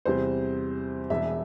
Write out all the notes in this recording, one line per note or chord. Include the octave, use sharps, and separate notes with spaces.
E2 C3 G3 C5
E1 E2 E3 E5